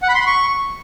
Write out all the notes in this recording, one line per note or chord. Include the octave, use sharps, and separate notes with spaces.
F#5
B5
C6
B5
C#6